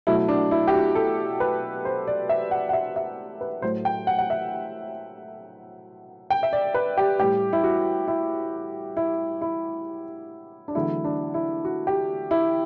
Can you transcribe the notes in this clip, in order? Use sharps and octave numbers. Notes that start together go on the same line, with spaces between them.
B2 F#3 A3 E4
D4
E4
G4
F#4
A4
B4
C5
D5
E5
F#5
F#5
E5
E5
B4
A2 F#3 A3 C5
G5
F#5
F#5
E5
G5
E5
D5
B4
G4
A2 G3 G4
E4
F#4
E4
E4
E4
D4
E2 D3 F#3 A3 E4
D4
E4
F#4
G4
E4